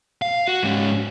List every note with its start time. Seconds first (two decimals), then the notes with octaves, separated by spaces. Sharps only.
0.22 F5
0.48 F#4
0.63 G#2 C#4